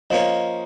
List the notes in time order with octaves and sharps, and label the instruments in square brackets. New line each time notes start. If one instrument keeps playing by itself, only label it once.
[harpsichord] F3 A#3 C#4 [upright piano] D#5